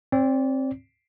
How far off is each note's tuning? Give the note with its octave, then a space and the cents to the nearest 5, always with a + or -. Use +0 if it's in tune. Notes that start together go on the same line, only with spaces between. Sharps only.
C4 +20 D5 -25